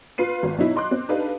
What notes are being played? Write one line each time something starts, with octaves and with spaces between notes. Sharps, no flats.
F4 B4 C7 D#7
G#1
B2 F#3 D#4 E4
D#5 C6 D6 F#6
C4
D4 D#4 G4 A4 B4 F5